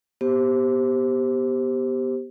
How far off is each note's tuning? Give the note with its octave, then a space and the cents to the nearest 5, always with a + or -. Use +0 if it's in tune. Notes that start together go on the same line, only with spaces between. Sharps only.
B3 +0 G4 +0 C5 +0